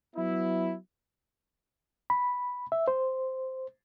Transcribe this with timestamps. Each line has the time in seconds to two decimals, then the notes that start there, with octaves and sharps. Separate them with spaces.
0.16 F#3 B3 E4
2.10 B5
2.72 E5
2.88 C5